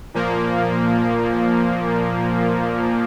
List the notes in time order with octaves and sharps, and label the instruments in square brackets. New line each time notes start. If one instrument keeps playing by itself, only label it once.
[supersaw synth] A#2 F3 A#3